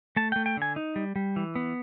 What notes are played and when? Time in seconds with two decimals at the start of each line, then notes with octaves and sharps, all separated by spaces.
0.16 A3 A5
0.32 A3 G5
0.46 G5
0.57 D3 G#5
0.76 D#4
0.96 G3
1.16 G3
1.36 E3
1.55 B3